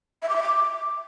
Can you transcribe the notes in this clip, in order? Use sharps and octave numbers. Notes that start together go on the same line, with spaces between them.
E5
D6
E5
D6